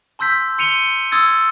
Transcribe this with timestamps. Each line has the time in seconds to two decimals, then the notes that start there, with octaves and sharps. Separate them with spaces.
0.19 A5 C6 E6 G6 B6
0.58 C6 C#7 D#7 F7 G7
1.12 C6 D#6 E6 G#6 A6